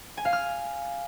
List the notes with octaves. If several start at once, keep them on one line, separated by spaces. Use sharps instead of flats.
G#5
F5
F6